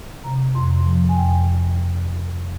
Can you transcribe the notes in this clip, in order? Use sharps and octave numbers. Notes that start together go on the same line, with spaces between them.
C3 A#5
F2 C6
F3
G#5
F2 G5